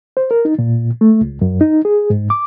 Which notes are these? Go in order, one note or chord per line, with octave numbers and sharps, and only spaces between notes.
C5
A#4
D#4
A#2
A3
C#2
F#2
D#4
G#4
G#2
D6